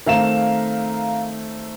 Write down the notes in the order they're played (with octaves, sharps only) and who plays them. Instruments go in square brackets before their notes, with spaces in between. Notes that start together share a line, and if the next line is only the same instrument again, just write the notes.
[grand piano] D#3 A3 C4 [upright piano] A#4 F5 E7